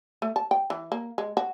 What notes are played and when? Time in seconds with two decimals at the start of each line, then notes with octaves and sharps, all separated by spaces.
0.22 A3
0.36 A5
0.51 G5
0.70 E3
0.92 A#3
1.18 G#3
1.37 F#4